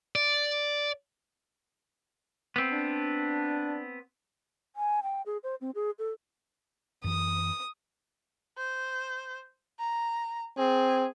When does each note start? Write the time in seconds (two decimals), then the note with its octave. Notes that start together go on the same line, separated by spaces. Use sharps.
0.16 D5
2.56 B3 C4
2.72 D4
4.76 G#5
5.03 G5
5.26 G#4
5.43 C5
5.61 C4
5.75 G#4
5.99 A4
7.04 F#2 E3 D#6
8.58 C5
9.79 A#5
10.58 C4 G#4